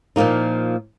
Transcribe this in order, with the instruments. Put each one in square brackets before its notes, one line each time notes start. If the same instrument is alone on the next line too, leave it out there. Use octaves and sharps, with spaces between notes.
[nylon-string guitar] A#2 F3 A#3 D#4